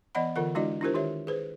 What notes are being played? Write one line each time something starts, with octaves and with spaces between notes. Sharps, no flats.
E3 B3 D5 D#5 F#5 B5
D3 E3 F4 A4 A#4 F#5
G#3 D4 E4 F#4 D5 D#5
D4 E4 F4 G4 A#4 C5
D#3 G4 C#5 E5
G#4 B4 C5